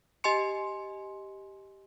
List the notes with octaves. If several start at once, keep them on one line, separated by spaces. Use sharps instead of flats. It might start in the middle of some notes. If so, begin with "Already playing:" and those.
G4 D#5 G#5 C6 C#7